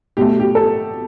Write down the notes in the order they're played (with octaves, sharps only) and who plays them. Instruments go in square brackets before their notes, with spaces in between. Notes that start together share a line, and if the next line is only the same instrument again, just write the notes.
[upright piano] B2 A3 G4
G4
A4